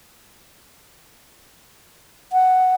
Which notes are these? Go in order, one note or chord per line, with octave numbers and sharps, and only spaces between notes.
F#5